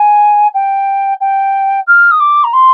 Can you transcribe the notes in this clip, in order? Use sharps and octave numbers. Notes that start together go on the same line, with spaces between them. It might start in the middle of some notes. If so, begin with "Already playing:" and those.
Already playing: G#5
G5
G5
F6
D#6
D6
A#5
C6